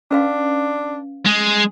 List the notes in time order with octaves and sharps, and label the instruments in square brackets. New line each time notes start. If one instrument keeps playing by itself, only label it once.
[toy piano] C#4 B4 F5 [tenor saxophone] D4
[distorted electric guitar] G#3 [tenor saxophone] G#4